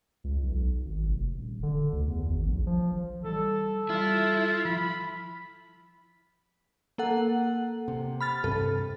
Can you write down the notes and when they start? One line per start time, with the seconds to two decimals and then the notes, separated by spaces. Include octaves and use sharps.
0.24 C#2
0.43 B1
0.86 G#1
1.09 F1
1.36 D#1
1.63 D3
1.92 D2
2.08 E2
2.27 G#1
2.46 A#1
2.67 F3
3.24 E3 F#3 G3 A4
3.89 G3 E4 F4
4.65 F3 B5
6.98 A#3 A4 F#5
7.88 C3
8.21 B5 F6 A6
8.44 G2 C3 C4 A4